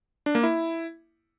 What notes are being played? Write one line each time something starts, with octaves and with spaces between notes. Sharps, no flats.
D4
A#3
E4